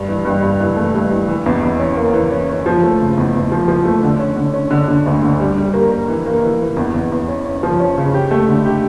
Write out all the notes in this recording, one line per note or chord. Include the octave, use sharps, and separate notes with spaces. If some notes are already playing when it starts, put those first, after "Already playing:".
Already playing: G2
E3
G2
G2
E3
A3
G2
E3
E3
E2
E2
C#4
A#3
E3
C#4
C#4
F3
A3
C#3
E2
E2
F3
F3
A3
D3
C#4
D3
C#4
D3
D3
D2
D3
G3
G3
A#3
A#3
E3
A#3
E3
E3
E2
E2
E2
C#4
C#4
F3
C#4
C#3
G4
A3
D3
G4